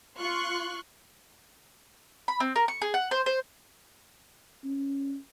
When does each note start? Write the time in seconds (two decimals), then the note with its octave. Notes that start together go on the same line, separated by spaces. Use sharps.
0.19 F4 C6 C#6 F#6
2.28 B5
2.40 C4
2.56 A#4
2.68 C#6
2.82 G#4
2.94 F#5
3.11 C5
3.26 C5
4.64 C#4